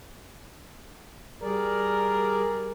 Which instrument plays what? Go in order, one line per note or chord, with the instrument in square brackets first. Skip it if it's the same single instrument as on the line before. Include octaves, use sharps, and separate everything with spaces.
[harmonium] G3 G#4 D5 [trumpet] A#4